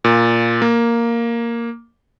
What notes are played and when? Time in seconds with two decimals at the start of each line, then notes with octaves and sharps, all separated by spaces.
0.04 A#2
0.62 A#3